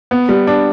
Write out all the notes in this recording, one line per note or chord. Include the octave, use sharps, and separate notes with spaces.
B3
G3
D4